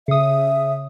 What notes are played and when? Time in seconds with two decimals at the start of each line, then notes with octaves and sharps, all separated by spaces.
0.08 C#3 E5 D#6